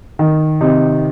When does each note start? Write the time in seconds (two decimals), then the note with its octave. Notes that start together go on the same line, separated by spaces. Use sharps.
0.19 D#3
0.61 C3 D#4